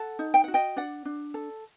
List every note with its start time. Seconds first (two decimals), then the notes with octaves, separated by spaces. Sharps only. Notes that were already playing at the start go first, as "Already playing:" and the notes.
Already playing: A4 F#5 A5
0.19 D#4
0.34 G5
0.44 F#4 F#5
0.54 D#5 G5
0.76 D4 D5 F#5
1.05 D4
1.34 A4